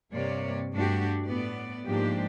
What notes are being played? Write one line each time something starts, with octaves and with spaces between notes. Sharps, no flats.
G2 C3 A#3 C#5 D5
G2 A3 D4 F#4 G4
A2 B3 D5
G#2 F3 G#3 A#3 D4 G4